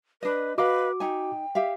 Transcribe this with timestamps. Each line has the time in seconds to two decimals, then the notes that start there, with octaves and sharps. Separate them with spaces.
0.23 D4 B4 D#5
0.58 F#4 B4 D#5 F5 B5 D6
1.00 D#4 G5 G#5
1.55 G4 E5 F5